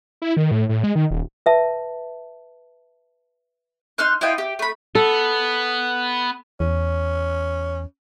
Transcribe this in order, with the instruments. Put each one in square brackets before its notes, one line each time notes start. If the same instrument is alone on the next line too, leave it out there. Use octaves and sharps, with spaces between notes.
[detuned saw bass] E4
D#3
A2
A2
G#3
D#3
D#1
[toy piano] B4 E5 A5
[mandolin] D#4 C6 F6 F#6
E4 F4 D#5 G5
G4
A3 B5
[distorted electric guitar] B3 [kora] A4
[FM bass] E2 [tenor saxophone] C#4